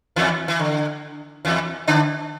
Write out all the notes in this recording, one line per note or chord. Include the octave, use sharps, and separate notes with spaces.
E2 E3
E3
D3
E2 E3
D3 D4